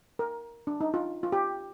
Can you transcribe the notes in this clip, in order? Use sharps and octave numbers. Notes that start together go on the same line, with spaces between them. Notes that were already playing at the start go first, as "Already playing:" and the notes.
A#4
D4
D#4
F4
F4
G4